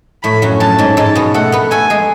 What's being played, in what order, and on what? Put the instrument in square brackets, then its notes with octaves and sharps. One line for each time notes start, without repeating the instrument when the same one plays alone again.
[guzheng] A2 A3 [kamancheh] B5
[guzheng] F#2 F#3
[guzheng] F#2 F#3 [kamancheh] A5
[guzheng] G#2 G#3
[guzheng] G#2 G#3 [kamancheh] A5
[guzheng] B2 B3
[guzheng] A3 A4 [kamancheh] F#5
[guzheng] B3 B4
[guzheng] A3 A4 [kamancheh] G#5
[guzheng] G#3 G#4